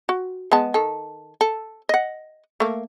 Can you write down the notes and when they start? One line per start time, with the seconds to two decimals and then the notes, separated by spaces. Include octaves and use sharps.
0.09 F#4
0.52 G#3 B3 A5
0.74 D#3 A4
1.41 A4
1.89 D#5 F#5
2.60 A3 A#3